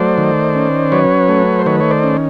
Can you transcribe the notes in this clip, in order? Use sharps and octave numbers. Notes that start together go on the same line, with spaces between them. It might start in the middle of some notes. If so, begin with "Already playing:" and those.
Already playing: F#3 A3 C5 D5
D#3
C#4
F#3 B4 C#5
A3
C5
D#3 B4 C#5
C#5
C5 D5
C#4